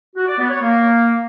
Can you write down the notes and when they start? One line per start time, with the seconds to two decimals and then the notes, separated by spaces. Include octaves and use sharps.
0.16 F#4
0.27 D5
0.38 B3
0.49 C#5
0.61 A#3